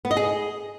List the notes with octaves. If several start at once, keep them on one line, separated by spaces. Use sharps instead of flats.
B3
D#5
G#4